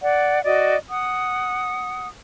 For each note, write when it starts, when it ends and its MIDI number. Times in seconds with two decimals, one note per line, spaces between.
0.01 0.42 74
0.01 0.42 78
0.44 0.76 66
0.44 0.76 74
0.44 0.76 75
0.90 2.07 78
0.90 2.07 87